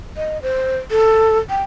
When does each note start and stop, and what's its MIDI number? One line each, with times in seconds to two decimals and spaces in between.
0.17 0.41 75
0.42 0.78 72
0.91 1.38 69
1.50 1.63 79